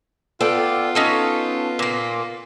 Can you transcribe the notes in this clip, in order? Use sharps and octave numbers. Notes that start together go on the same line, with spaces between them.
B3 F4 A4 D5 G5
C#4 D#4 A4
A#2 A#3